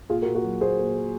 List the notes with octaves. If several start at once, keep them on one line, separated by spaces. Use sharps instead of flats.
A#2 F4 G#4
F#4 A#4
A#2
F#4 A#4
F#3
A#3 G#4 C5
A#3
A#3